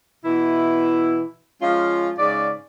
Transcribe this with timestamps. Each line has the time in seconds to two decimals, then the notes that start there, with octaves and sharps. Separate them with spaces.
0.25 B2 E3 E4
1.62 F3 G#3 C#4 F4
2.19 G#2 C#3 D5